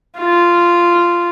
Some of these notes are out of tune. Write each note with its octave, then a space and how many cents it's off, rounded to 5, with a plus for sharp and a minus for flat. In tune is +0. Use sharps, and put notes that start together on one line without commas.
F4 -10